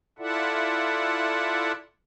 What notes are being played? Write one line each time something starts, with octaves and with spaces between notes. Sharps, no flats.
E4 F4 A4 D5 E5 F#5